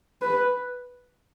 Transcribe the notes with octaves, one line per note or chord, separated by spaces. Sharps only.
B4